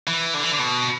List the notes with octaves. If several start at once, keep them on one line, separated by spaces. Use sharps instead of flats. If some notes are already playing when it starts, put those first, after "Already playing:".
E3
D3
E3
D3
B2